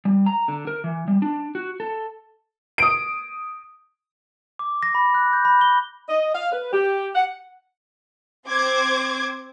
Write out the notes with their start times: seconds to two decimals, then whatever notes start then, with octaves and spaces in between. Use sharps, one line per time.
0.05 G3
0.26 A#5
0.48 D3
0.67 A#4
0.84 E3
1.08 G3
1.22 D4
1.55 F#4
1.80 A4
2.78 D#6 D7
4.59 D6
4.83 A#6
4.95 B5
5.15 F#6
5.33 G6
5.45 B5
5.61 G7
6.09 D#5
6.35 F5
6.51 B4
6.73 G4
7.15 F#5
8.47 C4 C5 D6 G#6